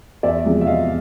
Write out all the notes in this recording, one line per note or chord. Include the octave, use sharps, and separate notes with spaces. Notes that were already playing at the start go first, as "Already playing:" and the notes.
E2 D5 E5
C3 F3 G#3
E5
E2 D#5 F5